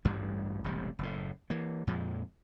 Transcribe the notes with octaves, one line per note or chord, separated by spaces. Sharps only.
A1 D2 G2 G3
E1 A1 C3 G3
F#1 A2
E3 A#3
F2 A#2 F3 G#3